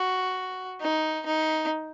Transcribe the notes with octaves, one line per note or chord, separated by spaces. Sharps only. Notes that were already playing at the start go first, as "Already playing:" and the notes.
Already playing: F#4
D#4
D#4